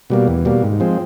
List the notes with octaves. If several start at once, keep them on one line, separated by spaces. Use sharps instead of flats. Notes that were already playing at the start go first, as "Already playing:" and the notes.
B2 G3 A#3
E2
B2 G3 A#3
G#2
F3 G#3 C4